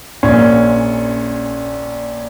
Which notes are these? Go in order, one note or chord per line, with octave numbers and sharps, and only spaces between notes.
A#1 A#2 C#4